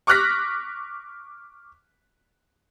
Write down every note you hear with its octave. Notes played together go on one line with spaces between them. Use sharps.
C#6 D6 F6 F#6 A#6 B6